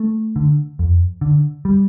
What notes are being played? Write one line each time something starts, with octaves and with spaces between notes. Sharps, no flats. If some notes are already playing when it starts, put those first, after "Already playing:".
Already playing: A3
D3
F2
D3
G3